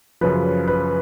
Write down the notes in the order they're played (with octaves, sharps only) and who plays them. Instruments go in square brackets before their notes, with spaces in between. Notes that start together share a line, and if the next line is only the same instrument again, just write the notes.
[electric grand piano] F#2 C#3 F3 [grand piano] B4
[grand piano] B4